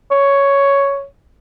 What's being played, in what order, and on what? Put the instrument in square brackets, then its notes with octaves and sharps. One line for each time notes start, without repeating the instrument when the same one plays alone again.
[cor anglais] C#5